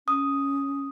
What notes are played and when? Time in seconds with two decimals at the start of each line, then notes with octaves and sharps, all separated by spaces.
0.08 C#4 D#6